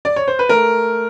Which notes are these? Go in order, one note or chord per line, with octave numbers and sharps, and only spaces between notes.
D5
C#5
C5
B4
A3 A#4